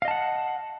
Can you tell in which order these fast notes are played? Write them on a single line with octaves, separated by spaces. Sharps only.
F5 D#5 A5 F#5